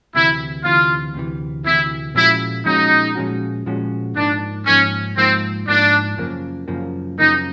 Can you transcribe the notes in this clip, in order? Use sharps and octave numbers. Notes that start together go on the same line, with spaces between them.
D2 C3 E3 E4
D2 C3 E3 F4
D2 C3 E3
D2 C3 E3 E4
A#2 F3 G#3 C#4 E4 F#4
A#2 F3 G#3 C#4 D#4 F#4
A#2 F3 G#3 C#4 F#4
A#2 F3 G#3 C#4 F#4
G#2 F3 A#3 D4 D#4
G#2 F3 A#3 C#4 D#4
G#2 F3 A#3 C4 D#4
G#2 F3 A#3 D4 D#4
F#2 C#3 F3 A#3
F#2 C#3 F3 A#3
F#2 C#3 F3 A#3 D#4